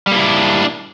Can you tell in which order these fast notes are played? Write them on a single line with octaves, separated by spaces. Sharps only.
G3 A#3 E4 D4